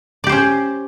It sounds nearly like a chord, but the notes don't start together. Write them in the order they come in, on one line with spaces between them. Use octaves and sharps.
D5 G4 C5 C#4